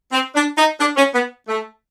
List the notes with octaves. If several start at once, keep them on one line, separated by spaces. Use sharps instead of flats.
C4
D4
D#4
D4
C#4
B3
A3